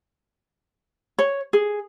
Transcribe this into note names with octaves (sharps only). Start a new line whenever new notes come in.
C#5
G#4